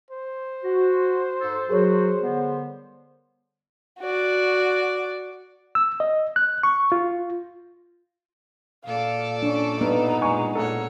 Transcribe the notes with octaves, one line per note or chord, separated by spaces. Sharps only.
C5
F#4
G#2 A4
F#3 F#4 G#4 A#4 C#5
D3 G3 B3
F#4 D5
E6
D#5
F#6
C#6
F4
A#2 A4 D5 F5
C#4 D4
G2 B3 D#4
A#2 G#3 G#5 C#6
A#2 A4 A#4 C#5 F#5